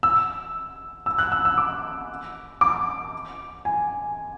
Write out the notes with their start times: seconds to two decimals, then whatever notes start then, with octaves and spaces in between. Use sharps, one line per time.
0.03 E6
1.06 E6
1.18 F#6
1.32 E6
1.45 E6
1.58 D6
2.61 D6
3.65 G#5